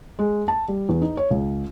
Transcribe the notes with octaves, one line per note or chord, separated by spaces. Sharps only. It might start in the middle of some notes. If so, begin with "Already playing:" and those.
G#3
A5
G3
E2
D#4
C#5
C#2